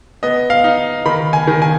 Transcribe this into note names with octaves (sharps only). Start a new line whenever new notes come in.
B3 D#5
F5
D#4
D#3 B5
G#5
D#3
G#5